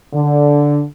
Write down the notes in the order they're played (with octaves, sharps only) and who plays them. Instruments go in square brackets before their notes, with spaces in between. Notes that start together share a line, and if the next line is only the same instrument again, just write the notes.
[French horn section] D3